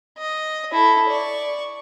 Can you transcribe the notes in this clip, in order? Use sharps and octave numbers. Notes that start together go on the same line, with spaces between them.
D#5
E4 A4
D5 C#6